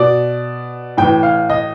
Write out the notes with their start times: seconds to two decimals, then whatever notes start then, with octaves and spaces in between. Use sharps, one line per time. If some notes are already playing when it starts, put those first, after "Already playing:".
Already playing: B2 D5
0.97 A2 E3 G5
1.23 F5
1.50 D#5